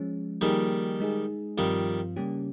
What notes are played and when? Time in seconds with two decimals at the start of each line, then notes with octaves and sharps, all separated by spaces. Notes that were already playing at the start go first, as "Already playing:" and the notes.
Already playing: F3 G#3 C#4
0.41 D#3 F3 G3 A#3 D#4 G#4
1.00 G#3 D#4 G#4
1.57 G2 D#3 F3 G3 C4 F4
2.16 C#3 G3 A#3 C#4 G4